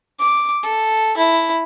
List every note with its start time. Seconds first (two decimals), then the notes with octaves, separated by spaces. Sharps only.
0.20 D6
0.64 A4
1.17 E4